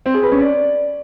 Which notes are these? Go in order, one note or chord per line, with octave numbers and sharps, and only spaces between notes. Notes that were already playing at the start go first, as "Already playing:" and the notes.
C4
G#4
B4
C#4
D5